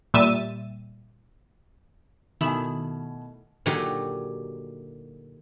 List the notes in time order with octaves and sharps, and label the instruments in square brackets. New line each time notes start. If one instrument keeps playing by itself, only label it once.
[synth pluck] A#2 G3 E5 A6 D#7 E7
[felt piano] B2 G#5 [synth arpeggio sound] D#3 [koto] A3 E4
[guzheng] A#2 D3 F#3 D#4 F#4 G4